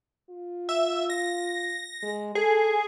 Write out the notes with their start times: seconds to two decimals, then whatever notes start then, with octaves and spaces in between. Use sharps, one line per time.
0.30 F4
0.69 E5
1.10 A#6
2.03 G#3
2.35 G#4 A4